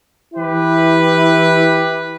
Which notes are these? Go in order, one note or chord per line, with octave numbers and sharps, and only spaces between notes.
E3 E4 G4 B4